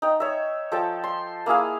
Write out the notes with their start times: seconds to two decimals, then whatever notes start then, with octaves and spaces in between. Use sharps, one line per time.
0.02 D#4 G5
0.20 C#5 E5
0.72 F3 A4 G5 A5
1.04 C6
1.46 A#3 E4 G#4 F5